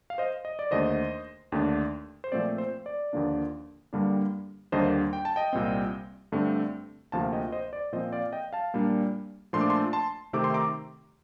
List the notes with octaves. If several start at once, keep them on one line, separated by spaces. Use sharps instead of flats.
F5
C5 D#5
D#5
D5
D#2 D3 A3 C5 D#5
D#2 D3 A3 D4
C5
A#2 F3 A3 C4 D5
C5
D5
D#2 D3 F3 A#3 D4
G2 D3 G3 A#3 D4
D#2 D3 G3 A#3 D4 C5 D#5
G5
A5
D#5 G5
C2 A#2 G3 C4
G2 D3 A3 C4
D2 C3 F3 A#3 F5 A5
D#5 G5
C5 D#5
D5
A#2 F3 C4 C5 D#5
D5 F5
D#5 G5
F5 A5
A#2 G3 A#3 D4
A#2 F3 A3 D4 C6
D6
A5 C6
A5 C6
C3 D#3 A3 C4 D6
C6
A#5 D6